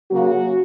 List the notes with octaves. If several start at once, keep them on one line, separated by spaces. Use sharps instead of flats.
C#3 F#3 A#3 F#4